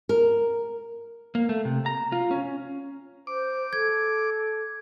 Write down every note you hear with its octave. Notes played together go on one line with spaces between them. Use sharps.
A#4
A#3
A3
C3
A#5
F4
C#4
C5 D6
A4 G#6